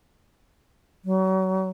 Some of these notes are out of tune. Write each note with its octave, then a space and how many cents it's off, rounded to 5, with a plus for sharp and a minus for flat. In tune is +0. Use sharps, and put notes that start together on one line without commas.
F#3 +35